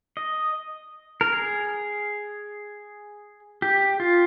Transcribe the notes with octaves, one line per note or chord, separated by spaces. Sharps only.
D#5
A#4
G#4
G4
F4